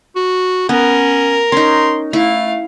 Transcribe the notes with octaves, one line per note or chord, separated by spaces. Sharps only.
F#4
B3 C#4 A#4
C#4 D#4 C6
A3 E4 F5